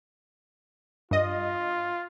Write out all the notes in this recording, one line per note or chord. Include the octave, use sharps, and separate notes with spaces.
G2 F4 D#5